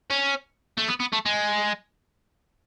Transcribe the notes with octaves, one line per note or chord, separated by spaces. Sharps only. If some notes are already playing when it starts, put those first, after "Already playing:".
C#4
A3
B3
B3
A3
G#3